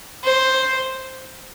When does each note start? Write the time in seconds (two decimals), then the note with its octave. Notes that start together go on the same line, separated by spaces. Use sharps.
0.24 C5